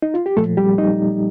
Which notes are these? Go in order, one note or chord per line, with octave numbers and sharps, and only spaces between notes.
D#4
F4
G4
A#2 F3 A3 A4
G3 G4
D#4